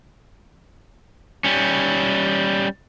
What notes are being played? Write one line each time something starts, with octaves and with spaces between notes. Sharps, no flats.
G3 C#4